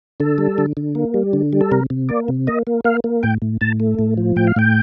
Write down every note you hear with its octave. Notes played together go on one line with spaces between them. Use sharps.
D3 A4
G3
D3
D3
A#3
G3
D3
G3
A4
C3 A#4
C3
A#3 D5
C3
A#3 D#5
A#3
A#3 F5
A#3
A2 G5
A2
A2 A5
A3
A2
F3
A2 G5
F5
A2 G5